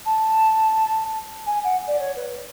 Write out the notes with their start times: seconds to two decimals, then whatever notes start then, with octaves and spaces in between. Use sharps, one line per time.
0.06 A5
1.47 G#5
1.64 F#5
1.87 D5
1.99 C#5
2.16 B4